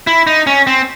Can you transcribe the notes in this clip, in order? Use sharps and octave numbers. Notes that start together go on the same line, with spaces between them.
E4
D#4
C#4
C4